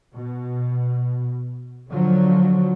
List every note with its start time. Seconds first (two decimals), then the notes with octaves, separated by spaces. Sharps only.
0.13 B2
1.90 D3 F3 F#3